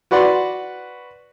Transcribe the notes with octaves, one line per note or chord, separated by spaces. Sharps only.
F#4 B4 D5 F#5 C6